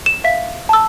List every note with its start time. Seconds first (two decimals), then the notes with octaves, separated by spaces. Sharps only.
0.06 E7
0.24 E5 F5 B6
0.69 A5 E6